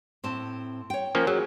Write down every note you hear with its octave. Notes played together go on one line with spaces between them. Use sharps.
A2 C4 A5
C#5 G5
F3 A#3 C#4
F#3 G#4